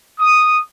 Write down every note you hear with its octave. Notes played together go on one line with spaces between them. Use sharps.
D#6